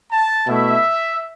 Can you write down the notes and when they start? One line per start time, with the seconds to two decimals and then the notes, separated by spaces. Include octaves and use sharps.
0.10 A5
0.47 B2 A3 E4 E5